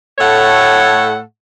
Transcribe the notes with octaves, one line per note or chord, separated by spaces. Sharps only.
A2 A3 A4 C#5 F#5